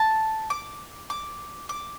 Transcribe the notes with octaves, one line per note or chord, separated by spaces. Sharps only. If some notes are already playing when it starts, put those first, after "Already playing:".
Already playing: A5
D6
D6
D6